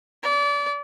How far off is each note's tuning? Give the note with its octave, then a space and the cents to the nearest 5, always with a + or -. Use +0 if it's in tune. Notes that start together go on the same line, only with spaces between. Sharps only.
D5 -30